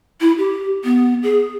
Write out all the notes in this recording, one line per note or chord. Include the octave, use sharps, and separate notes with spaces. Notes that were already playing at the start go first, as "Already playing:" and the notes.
E4
G4
B3
G#4